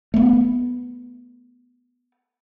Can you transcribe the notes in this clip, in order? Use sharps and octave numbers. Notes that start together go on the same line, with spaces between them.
A3 B3